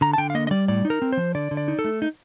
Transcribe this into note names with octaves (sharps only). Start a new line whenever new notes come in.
D3 A#5
A5
D3 G5
F5
A#3 D#5
D#5
G3 D5
A2 D5
D#4
A#4
C4
F3 C5
D3 D5
D3
D5
D#4
A4
A3
D#4